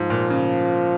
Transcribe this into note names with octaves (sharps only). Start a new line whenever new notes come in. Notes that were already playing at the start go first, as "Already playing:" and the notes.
Already playing: G#2 F3
A#2
C#3